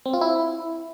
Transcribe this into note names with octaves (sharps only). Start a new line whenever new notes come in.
C4
F4
E4